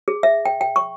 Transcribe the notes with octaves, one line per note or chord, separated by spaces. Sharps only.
G#4
E5
G5
G5
C#6